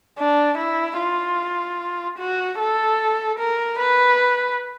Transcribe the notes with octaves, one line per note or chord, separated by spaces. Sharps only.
D4
E4
F4
F#4
A4
A#4
B4